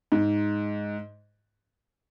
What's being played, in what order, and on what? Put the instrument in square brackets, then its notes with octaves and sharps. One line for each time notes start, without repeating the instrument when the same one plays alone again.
[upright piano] G#2